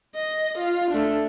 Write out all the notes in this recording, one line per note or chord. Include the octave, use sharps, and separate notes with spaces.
D#5
F4
A3 D4